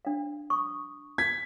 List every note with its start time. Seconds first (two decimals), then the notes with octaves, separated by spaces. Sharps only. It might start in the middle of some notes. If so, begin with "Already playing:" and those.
0.05 D4 F5
0.50 C#6 D#6
1.18 G#6 B6